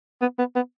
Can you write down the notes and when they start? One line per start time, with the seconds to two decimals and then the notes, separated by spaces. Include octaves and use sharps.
0.21 B3
0.38 B3
0.55 B3